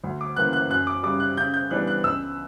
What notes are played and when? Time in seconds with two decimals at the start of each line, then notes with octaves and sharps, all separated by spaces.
0.04 D2
0.21 D6
0.36 C#3 E3 A#3 F#6
0.53 F#6
0.70 F#2 F#6
0.87 D6
1.03 C#3 G3 D6
1.20 F#6
1.37 C#3 G6
1.54 G6
1.71 E3 G3 B3 D4 F#6
1.87 F#6
2.04 C#2 E6